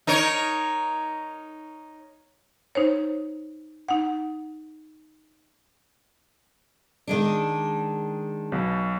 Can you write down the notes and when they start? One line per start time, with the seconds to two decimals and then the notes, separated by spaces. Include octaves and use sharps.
0.07 D#4 A#4 C#5
2.75 D#4 C5 C#5
3.88 D#4 F#5
7.07 D#3 G#3 D4
8.52 B1 B2